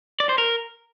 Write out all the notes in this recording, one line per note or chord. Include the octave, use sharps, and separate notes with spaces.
D5
C5
A#4